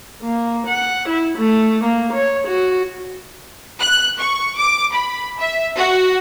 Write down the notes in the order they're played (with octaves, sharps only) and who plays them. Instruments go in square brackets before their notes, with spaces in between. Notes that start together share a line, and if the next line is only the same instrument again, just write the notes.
[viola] A#3
F#5
E4
A3
A#3
C#5
F#4
[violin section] F#6
C#6
D6
B5
E5
F#4